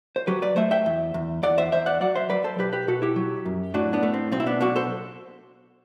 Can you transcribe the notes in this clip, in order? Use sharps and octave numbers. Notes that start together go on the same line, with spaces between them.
C5
F#3 G4 B4
B4 D5
A3 C5 E5
E5 G5
E2
E2
E2 D5 F#5
C5 E5
E2 C5 E5
D5 F#5
F#3 D5 F#5
C5 E5
F#3 B4 D5
A4 C5
B1 G4 B4
G4 B4
B2 F#4 A4
E4 G4
F#3
F#2
A2 D4 F#4
B3 D4
A3
C4
B1 C4
E4
B3 D4
B2 D4 F#4
A4 C5